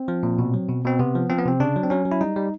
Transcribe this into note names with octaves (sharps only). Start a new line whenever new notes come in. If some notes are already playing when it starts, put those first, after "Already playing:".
Already playing: C4
F3
A#2
B2
F#3
B2
B2 C4
C3 B3
F3
F3 C4
B3
C3 C4
C#3 D4
F#3
C4
F#3 C#4
F#3
E4
G3 D#4
G3